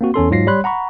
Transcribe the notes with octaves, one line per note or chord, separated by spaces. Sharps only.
A#3 C4 F#4
E2 C#4 A4 C6
G#2 F#3 F4 A#6 C7
G3 C#5 B5 C6 F#6
F#5 A#5 B5 C#6